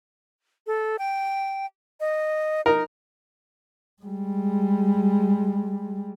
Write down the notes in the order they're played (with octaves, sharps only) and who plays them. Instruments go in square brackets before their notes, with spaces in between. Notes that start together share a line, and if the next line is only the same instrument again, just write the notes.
[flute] A4
G5
D#5
[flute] D#4 [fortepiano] A#4
[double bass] G3 G#3